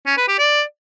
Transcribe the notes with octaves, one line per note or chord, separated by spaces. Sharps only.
C#4
B4
G4
D5